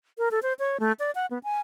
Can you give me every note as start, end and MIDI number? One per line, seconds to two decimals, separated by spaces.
0.18 0.29 70
0.31 0.39 69
0.43 0.53 72
0.59 0.78 73
0.80 0.92 57
0.99 1.11 74
1.15 1.26 78
1.31 1.38 59
1.44 1.60 80